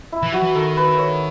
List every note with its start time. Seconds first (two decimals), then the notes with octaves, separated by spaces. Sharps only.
0.12 E4
0.23 E3
0.32 F#3 F#4
0.42 E3
0.55 D#3 A4
0.77 B4
0.98 C#5